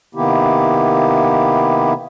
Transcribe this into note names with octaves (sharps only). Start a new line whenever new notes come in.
C3 D#3 A#3 B3 E4 G4